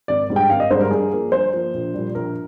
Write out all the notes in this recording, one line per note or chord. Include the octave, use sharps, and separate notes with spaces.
G#1 D5
G#2 G3 D4
G5
G#1 F5
D#5
G#2 G3 D4 C5
A#4
G2 G#4
F3 A#3
G2 C5
F3 A#3
A#1
A#2 G3
A#1 A#4